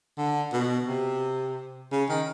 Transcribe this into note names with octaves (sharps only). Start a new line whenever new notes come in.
D3
B2
C3
C#3
D#3